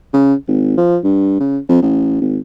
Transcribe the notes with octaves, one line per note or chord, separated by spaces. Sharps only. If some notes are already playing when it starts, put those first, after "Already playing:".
C#3
G#1
F3
G2
C#3
F2
A1
G#1